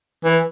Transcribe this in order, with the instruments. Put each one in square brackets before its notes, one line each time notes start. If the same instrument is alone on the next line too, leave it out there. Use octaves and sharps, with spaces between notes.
[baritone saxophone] E3